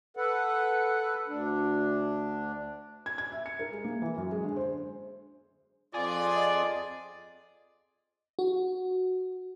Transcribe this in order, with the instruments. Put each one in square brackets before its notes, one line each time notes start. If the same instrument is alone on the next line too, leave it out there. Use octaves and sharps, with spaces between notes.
[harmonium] A4 B4 F#5
D2 D4
[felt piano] G#6
G#6
E5
C#7
A#4
G#3
A#3
E3
F#2
G#3
D3
C5
[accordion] F2 F4 [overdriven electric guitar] G#4 [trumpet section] D5
[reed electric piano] D#5
[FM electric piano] F#4